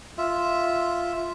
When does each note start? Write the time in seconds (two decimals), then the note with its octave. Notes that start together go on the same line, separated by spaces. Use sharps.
0.18 F4 E5